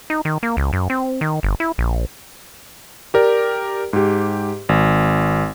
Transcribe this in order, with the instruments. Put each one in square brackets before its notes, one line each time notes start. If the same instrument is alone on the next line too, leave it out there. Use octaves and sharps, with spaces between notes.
[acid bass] D#4
D#3
A#3
C#2
F#2
C4
D#3
G1
E4
A#1
[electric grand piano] G4 A#4 D5
G#2 G4
G#1